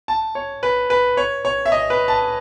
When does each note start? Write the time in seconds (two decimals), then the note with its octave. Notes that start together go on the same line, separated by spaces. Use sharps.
0.08 A5
0.35 C#5
0.63 B4
0.90 B4
1.17 C#5
1.45 C#5
1.66 E5
1.72 D#5
1.90 B4
2.08 A5